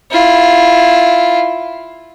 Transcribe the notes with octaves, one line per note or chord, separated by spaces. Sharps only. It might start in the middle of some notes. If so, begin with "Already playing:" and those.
E4 F4